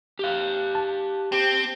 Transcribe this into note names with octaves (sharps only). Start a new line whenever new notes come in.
G4 F5
A5
C4 G4